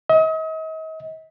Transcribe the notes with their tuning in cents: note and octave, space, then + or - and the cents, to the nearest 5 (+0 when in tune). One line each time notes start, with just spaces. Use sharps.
D#5 +40